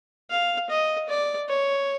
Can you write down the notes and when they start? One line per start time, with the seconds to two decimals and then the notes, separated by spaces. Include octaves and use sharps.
0.30 F5
0.70 D#5
1.09 D5
1.48 C#5